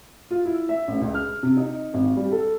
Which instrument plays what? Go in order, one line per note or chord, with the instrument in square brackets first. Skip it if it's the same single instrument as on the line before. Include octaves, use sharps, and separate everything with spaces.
[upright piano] F4
E4
E5
A1
C#2
F6
C3
D#4
G#1
G3
A4